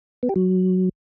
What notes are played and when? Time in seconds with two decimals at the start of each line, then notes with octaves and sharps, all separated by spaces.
0.23 B3
0.29 G4
0.36 F#3